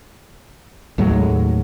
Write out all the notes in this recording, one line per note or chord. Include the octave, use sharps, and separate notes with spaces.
D#2 A2 F#3 G#3